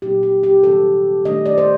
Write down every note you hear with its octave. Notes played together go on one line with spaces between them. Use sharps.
A#2 F#3 C4 D#4 G4
G4
G4
C3 D#3 G3 C4 A4
D#3 A3 D4 D#5
D5
C5